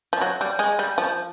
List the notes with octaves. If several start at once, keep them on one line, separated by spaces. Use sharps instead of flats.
F3
F#3
G3
G#3
G3
F3